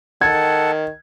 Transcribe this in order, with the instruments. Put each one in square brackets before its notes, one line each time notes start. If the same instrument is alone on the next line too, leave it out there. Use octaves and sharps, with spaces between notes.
[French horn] D#3 [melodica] A4 F#5 A5 [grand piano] G#6